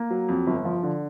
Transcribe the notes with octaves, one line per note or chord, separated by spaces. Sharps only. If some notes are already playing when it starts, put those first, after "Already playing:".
Already playing: A#3
F#3
F2
G1
F3
D3